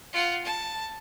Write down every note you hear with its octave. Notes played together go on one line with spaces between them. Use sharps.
F4 F#5
A5